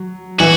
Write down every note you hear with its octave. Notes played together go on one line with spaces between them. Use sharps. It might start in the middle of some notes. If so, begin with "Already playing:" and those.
Already playing: F#3
E3 F#4